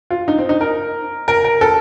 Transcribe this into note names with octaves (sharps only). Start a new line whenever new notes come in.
F4
D#4
C4
D#4
A#4
A#4
A#4
A4